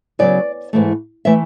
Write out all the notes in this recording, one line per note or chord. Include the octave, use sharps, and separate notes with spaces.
C#3 F#3 B3 D5
G#2 E3 A3
E3 A3 E5